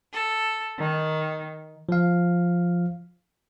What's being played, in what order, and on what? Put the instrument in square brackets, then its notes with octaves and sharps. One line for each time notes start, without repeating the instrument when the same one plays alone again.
[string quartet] A4
D#3
[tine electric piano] F3 F5